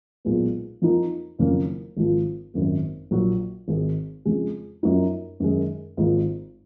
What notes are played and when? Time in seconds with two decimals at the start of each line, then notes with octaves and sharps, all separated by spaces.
0.25 B1 A#2 G#3 B3
0.82 F2 F3 A#3 D#4
1.39 F#1 F2 D#3 A#3 C#4
1.97 G#1 G#2 F3 A#3
2.54 G#1 F#2 D#3 A#3
3.11 A#1 A#2 F#3
3.68 G#1 G#2 D#3 G#3
4.25 F2 C#3 G#3
4.83 F#2 F3 A#3 D#4 F#4
5.40 F#2 D#3 G#3
5.97 G#1 G#2 F3 A#3 F4